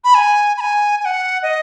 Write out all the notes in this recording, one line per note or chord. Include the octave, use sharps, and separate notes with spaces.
B5
G#5
B5
G#5
G#5
F#5
D#5